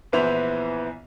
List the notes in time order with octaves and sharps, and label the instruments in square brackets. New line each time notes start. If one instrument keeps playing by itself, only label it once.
[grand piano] A#1 E3 B3 E4 C5 F7